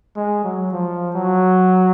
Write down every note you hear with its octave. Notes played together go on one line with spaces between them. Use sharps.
G#3
F#3
F3
F#3